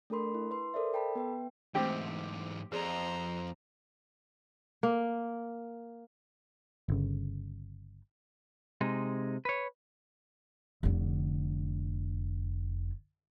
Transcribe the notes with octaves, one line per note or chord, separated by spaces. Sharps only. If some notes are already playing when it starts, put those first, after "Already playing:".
A3 D4 A4 A#4 B5 C6
E4
B4 C6
A4 A#4 C5 D5 E5
A4 G5 A5 B5
B3 B4 G5
E2 G#2 A3 C4 G4 C5 G5
F2 G#4 C5 D5 A#5
A#3
G1 C#3
C3 G#3 D#4
B4 C#5
F1 D3